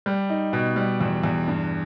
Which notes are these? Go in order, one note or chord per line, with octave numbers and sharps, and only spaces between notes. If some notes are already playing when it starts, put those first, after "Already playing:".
G3
D#4
B2
G3
E2
E2
G2